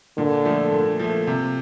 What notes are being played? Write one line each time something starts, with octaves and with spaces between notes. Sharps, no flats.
A#2 D3
F3 A3
A#2
F3 A3
C3